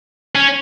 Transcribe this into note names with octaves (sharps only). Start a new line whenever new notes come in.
C#4